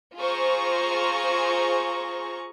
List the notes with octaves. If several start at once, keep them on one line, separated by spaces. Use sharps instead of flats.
F4 G#4 C5 A#5 C#6